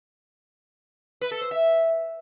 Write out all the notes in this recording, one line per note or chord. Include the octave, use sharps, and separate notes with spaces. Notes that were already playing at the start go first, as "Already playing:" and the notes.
B4
A4
C5
E5